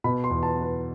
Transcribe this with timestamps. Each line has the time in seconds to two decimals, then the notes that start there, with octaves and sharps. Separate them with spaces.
0.04 B2 B5
0.24 C6
0.30 E2
0.43 A5
0.55 B3
0.62 B4